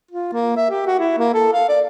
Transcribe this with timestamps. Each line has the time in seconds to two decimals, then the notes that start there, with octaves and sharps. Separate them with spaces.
0.11 F4
0.33 A#3
0.57 E5
0.70 G4
0.87 F#4
0.99 E4
1.19 A#3
1.34 A4
1.53 F5
1.68 D5